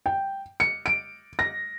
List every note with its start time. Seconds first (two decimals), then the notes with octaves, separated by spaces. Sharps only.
0.06 G5
0.60 C#7
0.86 D7
1.39 A#6